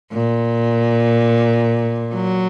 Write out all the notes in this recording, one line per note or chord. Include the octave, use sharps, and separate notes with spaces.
A#2
F#3